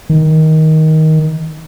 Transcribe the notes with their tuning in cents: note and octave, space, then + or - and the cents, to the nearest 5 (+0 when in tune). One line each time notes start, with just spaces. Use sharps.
D#3 +15